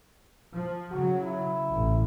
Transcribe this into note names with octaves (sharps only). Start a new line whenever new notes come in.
F3
C#3 F#3 F#4
E4
A1